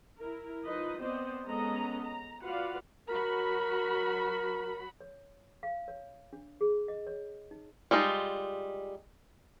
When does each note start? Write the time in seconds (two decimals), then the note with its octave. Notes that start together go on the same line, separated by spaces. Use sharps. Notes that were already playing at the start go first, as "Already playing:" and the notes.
0.16 E4 A#4
0.63 F3 D#4 F4 B4 D#5
0.98 B3 C4 C5 D5 D#5
1.45 G#3 B3 C#4 A4 D#5 A#5
2.03 A#5
2.43 F4 F#4 B4 D5 F5 F#5
3.09 F#3 F#4 A#4 B5
5.00 C#5
5.63 F5
5.88 C#5
6.33 D4
6.61 G#4
6.88 D#5
7.07 C#5
7.51 D#4
7.91 G3 G#3 D#4 F4